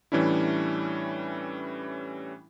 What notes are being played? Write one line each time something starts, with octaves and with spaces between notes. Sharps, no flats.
A2 E3 G3 C#4 D4 E4